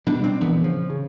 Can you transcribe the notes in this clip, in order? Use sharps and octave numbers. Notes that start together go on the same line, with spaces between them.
B2 G3 D4
C4 D4
A#1 E3 B3
C#3 F3
C#3